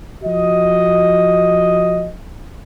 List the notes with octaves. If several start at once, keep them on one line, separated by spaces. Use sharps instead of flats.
F3 F#4 D#5